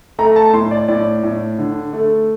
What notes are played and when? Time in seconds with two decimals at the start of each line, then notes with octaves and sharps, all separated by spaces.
0.19 A3 A#5
0.36 A5
0.53 A2 C6
0.71 D5
0.88 A2 D5
1.24 A2
1.59 D3
1.93 A3